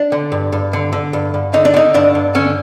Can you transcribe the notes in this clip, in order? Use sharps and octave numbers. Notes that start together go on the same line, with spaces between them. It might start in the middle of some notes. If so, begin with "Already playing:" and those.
Already playing: D4
D3
G2
G2
D3
D3
G2
G2
D3 D#4
D4
D3 D#4
G2 D4
G2
D3 C#4